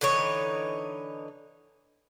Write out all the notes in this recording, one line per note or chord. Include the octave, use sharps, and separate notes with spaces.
D3 E3 D#4 C#5